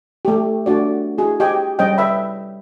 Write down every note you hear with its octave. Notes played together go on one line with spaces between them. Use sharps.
A3 G4
A3 D4 F#4 D5
E4 F#4 G#4
G4 D#5 G5 G#5
G3 C#4 C#5 D#5 G5
B4 E5 B5